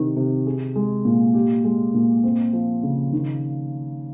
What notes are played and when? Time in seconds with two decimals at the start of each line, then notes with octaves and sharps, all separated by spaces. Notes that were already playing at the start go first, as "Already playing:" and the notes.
Already playing: C3 D#3
0.16 C3
0.47 G#4
0.76 G#3
1.05 A#2
1.34 G4
1.64 G#3
1.94 A#2
2.24 C4
2.53 F3
2.83 C#3
3.13 D#3